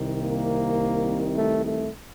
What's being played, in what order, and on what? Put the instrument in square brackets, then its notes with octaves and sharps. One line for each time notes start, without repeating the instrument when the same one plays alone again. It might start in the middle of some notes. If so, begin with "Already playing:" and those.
Already playing: [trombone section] C2 C3 D#3
A#3
A3
A3